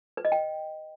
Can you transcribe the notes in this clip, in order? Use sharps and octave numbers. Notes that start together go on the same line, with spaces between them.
B4
D#5
G5